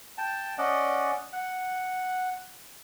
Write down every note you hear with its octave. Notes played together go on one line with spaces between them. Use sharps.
G5 A5
C#4 D5 D#5 F#5
F#5